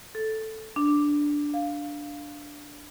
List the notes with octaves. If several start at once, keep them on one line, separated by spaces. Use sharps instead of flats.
A4
D4
F5